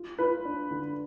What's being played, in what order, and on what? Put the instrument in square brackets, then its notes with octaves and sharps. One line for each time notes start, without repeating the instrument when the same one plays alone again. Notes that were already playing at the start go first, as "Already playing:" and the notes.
Already playing: [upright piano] F4
[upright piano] F4 [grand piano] B4
[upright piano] D4
D3